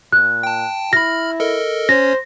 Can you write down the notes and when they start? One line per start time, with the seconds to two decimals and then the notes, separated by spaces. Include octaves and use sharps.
0.12 A#2 F#6
0.43 G5 A5
0.93 E4 B5 F6 A#6
1.40 A4 A#4 D#5
1.89 C#4 C5 C#5 A#6